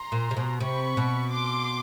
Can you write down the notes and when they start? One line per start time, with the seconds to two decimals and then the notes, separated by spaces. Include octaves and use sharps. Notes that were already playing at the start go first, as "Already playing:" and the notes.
Already playing: A#5 C6
0.12 A#2
0.31 C3
0.37 B2
0.60 C3 B5 C#6
0.97 B2
1.33 C6 D6